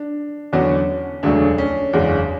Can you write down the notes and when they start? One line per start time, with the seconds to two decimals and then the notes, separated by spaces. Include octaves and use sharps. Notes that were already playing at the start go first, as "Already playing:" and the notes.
Already playing: D4
0.53 E2 D3 F#3 B3 C#4 F#4
1.23 E1 D2 C#3 F#3 A3 D4
1.58 C#4
1.93 F#1 E2 C#3 G#3 D4